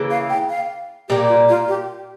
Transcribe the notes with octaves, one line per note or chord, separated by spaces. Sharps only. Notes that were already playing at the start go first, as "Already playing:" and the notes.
Already playing: C#3 E3 A#3
F5
G5
F5
A#2 G3 A#3 G4
F4
F4
G4